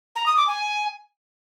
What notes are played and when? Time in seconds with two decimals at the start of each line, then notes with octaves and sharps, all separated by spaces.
0.15 A#5
0.26 D#6
0.37 D6
0.47 G#5